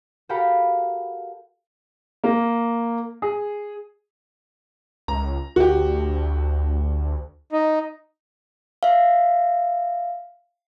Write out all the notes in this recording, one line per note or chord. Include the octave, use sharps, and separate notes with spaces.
F#4 G4 A4 A#4 F5 B5
A#3
G#4
C#2 A#5
D2 F#4 G4
D#4
E5 F5